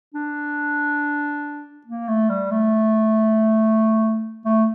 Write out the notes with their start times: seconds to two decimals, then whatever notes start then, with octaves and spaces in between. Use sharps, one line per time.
0.14 D4
1.86 A#3
2.08 A3
2.30 G3
2.51 A3
4.45 A3